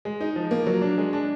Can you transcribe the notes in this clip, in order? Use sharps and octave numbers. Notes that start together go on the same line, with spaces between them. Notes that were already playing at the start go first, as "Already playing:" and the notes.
G#3
D#4
F3
A#3
F#3
D4
G#3
D4